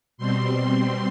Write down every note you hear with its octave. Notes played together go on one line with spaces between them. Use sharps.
B2 G3 C4 C6